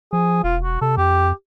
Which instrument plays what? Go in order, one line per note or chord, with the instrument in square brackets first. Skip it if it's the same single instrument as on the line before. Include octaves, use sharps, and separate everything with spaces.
[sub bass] F3 [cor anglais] G#4
[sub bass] E1 [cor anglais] F4
[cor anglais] F#4
[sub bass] C3 [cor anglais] A4
[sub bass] F2 [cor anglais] G4